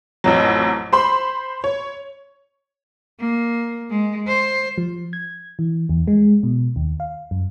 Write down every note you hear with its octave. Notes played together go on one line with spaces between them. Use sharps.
A1 F2 F#3
C5 B5 C6
C#5
A#3
G#3
C5
F3
G#6
E3
E2
G#3
B2
D#2
F5
F#2